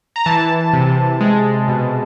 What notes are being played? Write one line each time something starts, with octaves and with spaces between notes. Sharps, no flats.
A#5
E3 A5
C3
G#3
B2